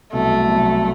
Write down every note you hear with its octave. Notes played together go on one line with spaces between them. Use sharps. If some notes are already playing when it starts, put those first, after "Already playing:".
C2 B2 F#3 A3
C2 B2 F#3